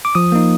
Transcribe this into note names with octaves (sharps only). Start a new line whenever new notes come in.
D6
F3 D#6
A#3 D#4